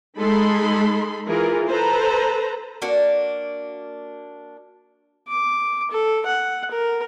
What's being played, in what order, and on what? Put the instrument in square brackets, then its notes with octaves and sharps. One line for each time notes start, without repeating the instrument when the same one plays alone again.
[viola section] G#3 D#4 A4 B5 C6
E3 F4 G#4 A#4
A4 B4 C5 A#5
[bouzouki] A#3 D4 F#4
[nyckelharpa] D6
A4
F#5
A#4